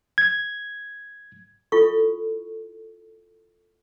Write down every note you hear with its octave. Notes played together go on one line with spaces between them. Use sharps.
G#6
E4 F4 A4 C#6